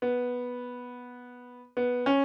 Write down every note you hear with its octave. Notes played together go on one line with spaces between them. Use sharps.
B3
B3
C#4